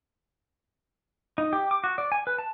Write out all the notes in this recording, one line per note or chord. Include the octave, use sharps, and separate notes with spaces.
D#4
G4
D6
F#4
D5
G#5
B4
A5